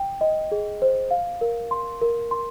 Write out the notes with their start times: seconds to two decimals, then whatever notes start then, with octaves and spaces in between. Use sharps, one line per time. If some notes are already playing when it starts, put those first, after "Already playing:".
Already playing: G5
0.21 D#5
0.52 G#4
0.82 C5
1.11 F5
1.41 A#4
1.71 C6
2.02 A#4
2.31 C6